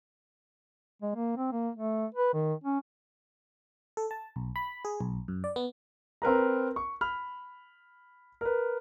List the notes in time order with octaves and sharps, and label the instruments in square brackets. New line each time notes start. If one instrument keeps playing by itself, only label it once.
[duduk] G#3
A#3
C4
A#3
A3
B4
D#3
C#4
[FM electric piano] A4
A5
B1
B5
G#4
B1
F#2
D5
B3
[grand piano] C4 A#4 B4 A#5
C#6
B5 F6
A#4 B4